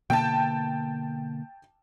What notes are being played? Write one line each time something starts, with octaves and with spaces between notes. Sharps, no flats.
B2 D3 A#3 G5 A5